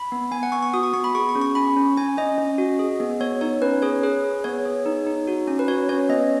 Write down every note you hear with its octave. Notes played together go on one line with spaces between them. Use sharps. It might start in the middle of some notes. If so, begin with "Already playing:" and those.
Already playing: B5
B3
B3 G#5
F#5
B3 C#6
C#6
F#4 D#6
C#6
B3 C#6
B5
G#4 C#6
C#6
C#4
C#6
C#4 B5
C#4
C#4 G#5
C#4 D#5
C#4
F#4
G#4
B3
B3 C#5
D#4 C#5
C#4 B4
G#4 C#5
G#4 B4
G#4
B3 C#5
G#4
D#4
D#4
F#4
C#4
B4
F#4 C#5
C#4 C#5
B3 D#5